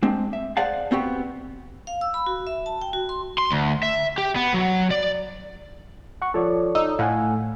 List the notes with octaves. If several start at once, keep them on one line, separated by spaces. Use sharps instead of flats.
G#3 C4 D4
E5
G#4 C5 D5 F5 F#5 A5
B3 C4 F#4 G4
F5
E6
B5
F#4
E5
A5
G5
F#4
C6
C6
D2
E5
G4
B3
F#3
D5
F#5 C#6
F3 A4 C#5 D5
D#4 E6
A2 F5 F#5 G#5